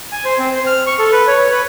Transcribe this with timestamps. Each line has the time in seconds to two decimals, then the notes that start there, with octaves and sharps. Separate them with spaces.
0.12 G#5
0.25 C5
0.38 C4
0.54 C5
0.67 F6
0.87 C#6
0.99 A4
1.12 B4
1.27 C#5
1.51 B4